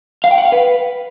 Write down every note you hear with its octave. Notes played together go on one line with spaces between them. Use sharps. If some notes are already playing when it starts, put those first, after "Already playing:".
F5
G5
F#5
F5
B4